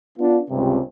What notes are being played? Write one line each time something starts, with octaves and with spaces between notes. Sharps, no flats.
B3 D4 F4
C#2 G2 C3